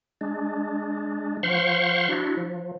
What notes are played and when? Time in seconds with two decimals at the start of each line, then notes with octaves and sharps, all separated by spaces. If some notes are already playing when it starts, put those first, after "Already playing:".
0.21 G#3 D4
1.43 F3 C5 F5 F#5 C6 C#6
2.09 D4 E4 F#4
2.37 F3